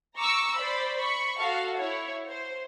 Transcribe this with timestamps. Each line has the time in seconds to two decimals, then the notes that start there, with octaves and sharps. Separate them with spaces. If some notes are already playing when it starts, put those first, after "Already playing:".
0.18 A#5 C#6 D6 E6
0.57 C5 D5 B5
0.99 B5 C#6
1.39 F#4 A4 F5
1.77 E4 C#5
2.27 C5